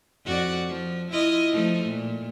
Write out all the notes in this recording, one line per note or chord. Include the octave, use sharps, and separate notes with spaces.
F2 F#4 D5
F3
E4 F4 D#5
F3 A3 D#4
A#2